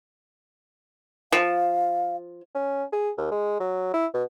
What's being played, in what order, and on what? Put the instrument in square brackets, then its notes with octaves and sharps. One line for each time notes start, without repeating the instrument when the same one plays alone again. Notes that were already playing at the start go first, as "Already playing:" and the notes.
[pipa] F3 [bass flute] F5
[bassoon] C#4
G#4
D#2
G#3
F#3
E4
B2